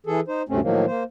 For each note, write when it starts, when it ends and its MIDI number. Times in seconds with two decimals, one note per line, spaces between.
0.06 0.20 52
0.06 0.20 68
0.06 0.20 69
0.28 0.43 63
0.28 0.43 72
0.49 0.60 38
0.49 0.60 43
0.49 0.60 48
0.49 0.60 57
0.49 0.60 60
0.49 0.60 61
0.62 0.86 45
0.62 0.86 51
0.62 0.86 53
0.62 0.86 54
0.62 0.86 58
0.87 1.04 58
0.87 1.04 72